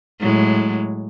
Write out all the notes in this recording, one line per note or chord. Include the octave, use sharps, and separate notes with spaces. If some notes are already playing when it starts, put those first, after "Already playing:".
A2 F#3 G#3